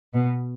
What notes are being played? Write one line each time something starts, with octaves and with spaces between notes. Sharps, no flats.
B2